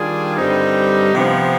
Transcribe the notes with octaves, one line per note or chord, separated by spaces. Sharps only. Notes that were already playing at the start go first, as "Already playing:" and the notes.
Already playing: D#3 G3 D4 F4 G#4
G2 D3 G3 C4 D#4
C3 F3 B3